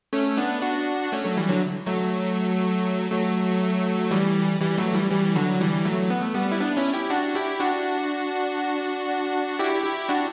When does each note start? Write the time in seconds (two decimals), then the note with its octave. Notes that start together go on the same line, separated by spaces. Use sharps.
0.13 A3 C#4
0.37 B3 D4
0.62 D4 F#4
1.12 A3 C#4
1.24 F#3 A3
1.37 E3 G3
1.50 D3 F#3
1.86 F#3 A3
3.11 F#3 A3
4.11 E3 G3
4.60 E3 G3
4.78 F#3 A3
4.94 E3 G3
5.10 E3 G3
5.36 D3 F#3
5.61 E3 G3
5.85 F#3 A3
6.10 B3
6.22 A3
6.34 G3 B3
6.52 E4
6.60 B3 D4
6.77 C#4 E4
6.94 E4 G4
7.10 D4 F#4
7.35 E4 G4
7.60 D4 F#4
9.59 E4 G4
9.84 E4 G4
10.09 D4 F#4